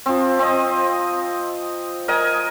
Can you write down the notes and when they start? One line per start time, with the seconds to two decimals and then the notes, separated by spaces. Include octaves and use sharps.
0.06 F3 C4
0.39 C4 D#5
2.08 A#4 D#5 G#5